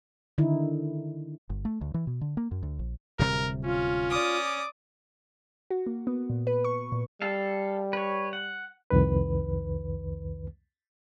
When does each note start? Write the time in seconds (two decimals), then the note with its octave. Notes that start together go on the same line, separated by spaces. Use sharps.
0.38 D3 D#3 D#4 E4
1.50 G1
1.65 A3
1.81 D2
1.94 E3
2.07 B2
2.21 D3
2.37 A#3
2.51 F#2
2.63 D2
2.79 A#1
3.19 D1 C3 G3 A#4
3.65 C#4 F4
4.11 D5 D6 D#6
5.70 F#4
5.86 A#3
6.07 B3
6.30 A#2
6.47 B4
6.64 C#6
6.92 A#2
7.22 G3 A4 F5
7.93 B4 C#5
8.33 F#5
8.90 C2 F2 D#3 B4